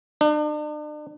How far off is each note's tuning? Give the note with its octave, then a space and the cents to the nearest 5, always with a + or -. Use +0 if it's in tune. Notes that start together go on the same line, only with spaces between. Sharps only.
D4 +40